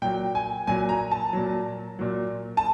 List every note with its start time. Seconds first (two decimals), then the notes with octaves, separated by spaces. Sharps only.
0.02 A#2 F#3 G5
0.35 G#5
0.67 A#2 F#3 G#5
0.89 A#5
1.11 A5
1.33 A#2 F#3
1.99 A#2 F#3
2.57 A5